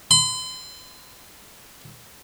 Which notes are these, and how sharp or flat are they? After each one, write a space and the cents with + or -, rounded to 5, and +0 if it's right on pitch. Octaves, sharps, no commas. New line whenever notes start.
C6 -40